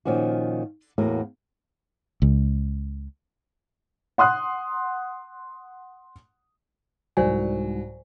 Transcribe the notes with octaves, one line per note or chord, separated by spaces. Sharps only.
A#2 D#3 F3 C#4 F#4
E2 A2 A#3 F#4 A#4
C#2
F#5 C6 D#6 F#6
C2 G#2 F#3 C5 D5 G#5